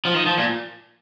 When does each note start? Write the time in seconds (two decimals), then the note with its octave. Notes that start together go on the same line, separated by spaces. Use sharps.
0.05 F3
0.14 D#3
0.26 F3
0.37 A#2